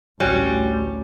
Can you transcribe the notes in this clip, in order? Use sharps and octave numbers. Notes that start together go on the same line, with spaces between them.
A1 D2 G3 C#4 F#4 C#5